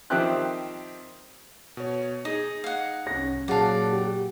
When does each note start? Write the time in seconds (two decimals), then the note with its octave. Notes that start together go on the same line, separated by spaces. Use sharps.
0.10 D#3 F3 C4 G4 E5 F#6
1.77 B2 C#5
2.25 D#4 G#4 D#5
2.64 F5 F#5
3.07 C2 C#4 A#6
3.48 A#2 F#3 G#4 D5 F5 F#5 A5
3.93 G4